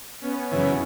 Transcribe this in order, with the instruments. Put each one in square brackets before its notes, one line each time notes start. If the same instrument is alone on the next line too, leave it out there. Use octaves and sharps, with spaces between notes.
[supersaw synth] B3 C#4
[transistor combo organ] F#2 C#3 E3